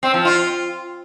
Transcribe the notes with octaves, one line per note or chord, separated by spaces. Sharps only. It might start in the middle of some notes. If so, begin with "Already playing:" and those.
C4
F3
F4